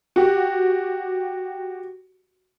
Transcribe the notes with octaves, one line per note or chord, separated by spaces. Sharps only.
F#4 G4